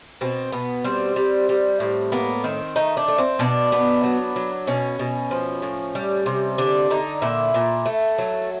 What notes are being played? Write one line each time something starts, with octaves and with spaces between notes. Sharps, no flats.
B2 C4
B2 B3
G3 C4
G3
G3
A2
A#3 B3
D#3 C4
A3 D#4
D4
A3
C4
B2 D4
B3
F#3
F#3
B2 C#4
B2
F3
A2
G3
C3
D3 D4
D3 D#4
A#2 E4
A#2
A3
F#3